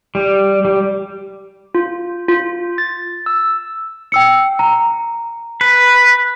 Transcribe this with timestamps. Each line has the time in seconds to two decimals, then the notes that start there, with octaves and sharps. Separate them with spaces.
0.15 G3
0.65 G3
1.75 F4
2.28 F4
2.78 A6
3.26 E6
4.12 G5 E6 C#7
4.59 A#5
5.61 B4